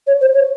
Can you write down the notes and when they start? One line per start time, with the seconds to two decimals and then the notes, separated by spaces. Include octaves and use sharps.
0.07 C#5
0.21 C5
0.34 C#5